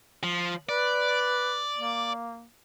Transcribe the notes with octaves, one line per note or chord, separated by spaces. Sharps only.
F3
B4 D5
A#3